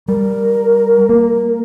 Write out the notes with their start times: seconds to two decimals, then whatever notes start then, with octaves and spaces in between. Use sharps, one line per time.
0.08 G3 A#4
1.09 A#3